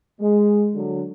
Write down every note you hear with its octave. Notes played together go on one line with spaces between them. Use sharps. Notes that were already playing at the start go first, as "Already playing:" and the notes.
G#3
D3 F#3